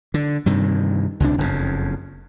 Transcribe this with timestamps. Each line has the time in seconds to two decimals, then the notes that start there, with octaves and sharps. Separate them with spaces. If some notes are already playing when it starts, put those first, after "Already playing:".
0.14 D3
0.46 G2 C3 D#3
1.20 C#2 C3 D#3 D4
1.38 F#1 F2 G#2 C#3